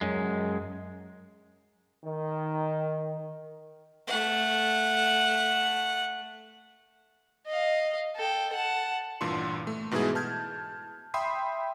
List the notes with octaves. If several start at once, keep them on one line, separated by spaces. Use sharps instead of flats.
F#2 G#3
D#3
A3 F#5
D#5 F5
A4 G5
F#5 A5
A1 G2 A#2 E3 D4 C6
A3
G#2 B2 E3 G#3 E4 G#4
A5 F6 G6 G#6
E5 G5 B5 C6 D#6 C7